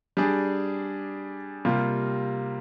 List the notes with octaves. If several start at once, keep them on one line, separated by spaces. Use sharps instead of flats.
G3 D4 G#4
C3 G3 A#3 F4